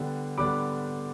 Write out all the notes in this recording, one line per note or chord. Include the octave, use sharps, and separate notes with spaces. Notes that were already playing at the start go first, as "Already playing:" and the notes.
Already playing: D3 G3 B3 D4 G5
D3 G3 B3 D4 B5 D6